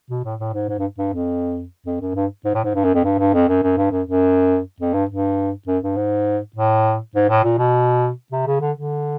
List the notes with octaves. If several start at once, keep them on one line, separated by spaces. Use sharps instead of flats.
B2
A2
A2
G#2
G#2
G2
G2
F2
F2
F#2
G2
G#2
A2
G#2
G2
F#2
F2
G2
G2
F2
F#2
F#2
G2
F#2
F#2
F2
G2
G2
F#2
G2
G#2
A2
G#2
A2
A#2
B2
C3
C#3
D3
D3